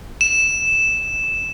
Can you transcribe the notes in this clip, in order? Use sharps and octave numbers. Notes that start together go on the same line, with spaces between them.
E7